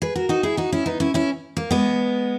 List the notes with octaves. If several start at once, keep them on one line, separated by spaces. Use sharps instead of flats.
G#4 B4
F#4 A#4
D#4 F#4
E4 G#4
D#4 F#4
C#4 E4
B3 D#4
C#4 E4
C#4 E4
A#3
G#3 B3